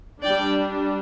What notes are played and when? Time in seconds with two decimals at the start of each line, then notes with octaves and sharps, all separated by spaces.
0.24 G3 D4 D5 G5